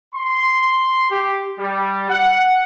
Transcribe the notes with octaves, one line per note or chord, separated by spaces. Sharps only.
C6
G4
G3
F#5